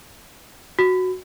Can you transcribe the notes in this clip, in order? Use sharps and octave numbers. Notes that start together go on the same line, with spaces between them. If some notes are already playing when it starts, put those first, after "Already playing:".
F#4